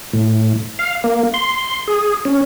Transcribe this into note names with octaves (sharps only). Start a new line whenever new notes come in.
A2
F5
A#3
C6
G#4
C#4